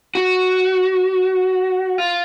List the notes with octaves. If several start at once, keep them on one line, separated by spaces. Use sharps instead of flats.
F#4
F4